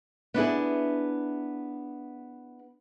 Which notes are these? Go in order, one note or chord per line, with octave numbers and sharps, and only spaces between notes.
B3 D4 E4 G#4